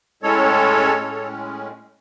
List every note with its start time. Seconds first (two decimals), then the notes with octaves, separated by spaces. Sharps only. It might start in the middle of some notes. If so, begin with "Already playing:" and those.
0.23 A2 G#3 C#4 A4 C#5
0.98 A2 G#3 C#4